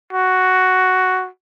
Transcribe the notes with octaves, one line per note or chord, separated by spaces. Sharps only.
F#4